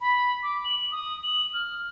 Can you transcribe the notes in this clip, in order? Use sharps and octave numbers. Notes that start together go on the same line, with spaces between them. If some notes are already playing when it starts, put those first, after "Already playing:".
B5
D6
F#7
D#6
F#7
F6